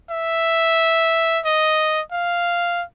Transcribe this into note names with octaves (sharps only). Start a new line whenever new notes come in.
E5
D#5
F5